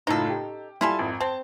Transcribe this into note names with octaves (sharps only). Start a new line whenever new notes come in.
F#1 A2 D#4 F4 A4
G4
G3 E4 F4 A4 G#5
G#1 F2
C4 A5